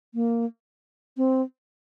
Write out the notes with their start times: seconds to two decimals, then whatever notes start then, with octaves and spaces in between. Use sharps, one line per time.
0.14 A#3
1.17 C4